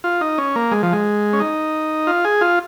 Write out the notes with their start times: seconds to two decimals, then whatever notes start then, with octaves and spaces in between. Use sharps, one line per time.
0.04 F4
0.21 D#4
0.38 C#4
0.56 A#3
0.71 G#3
0.83 F3
0.93 G#3
1.33 C#4
1.40 D#4
2.07 F4
2.25 G#4
2.41 F4